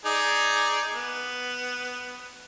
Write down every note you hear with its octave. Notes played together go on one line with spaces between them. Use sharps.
D#4 G#4 D5
B3